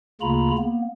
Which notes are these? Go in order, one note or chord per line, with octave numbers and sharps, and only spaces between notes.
D2 C#3 A#3 F4 A#5 B5
A#3 B3